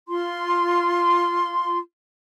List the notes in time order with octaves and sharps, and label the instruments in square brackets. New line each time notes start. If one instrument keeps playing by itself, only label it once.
[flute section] F4 C6